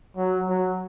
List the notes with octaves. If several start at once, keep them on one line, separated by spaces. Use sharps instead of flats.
F#3
F#3